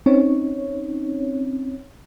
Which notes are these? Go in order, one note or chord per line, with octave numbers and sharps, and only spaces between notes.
C4 C#4 D#4 C#5